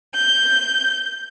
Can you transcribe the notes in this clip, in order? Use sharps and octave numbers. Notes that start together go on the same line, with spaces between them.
G6